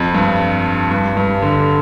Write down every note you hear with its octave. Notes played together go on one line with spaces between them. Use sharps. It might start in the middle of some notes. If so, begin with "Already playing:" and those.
Already playing: F2
G2
G2
G2
D3